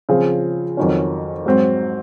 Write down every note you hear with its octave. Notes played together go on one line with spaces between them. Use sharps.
C#3 F3 C4 F4 G#4
F2 D#3 F#3 C#4
G#2 F#3 C4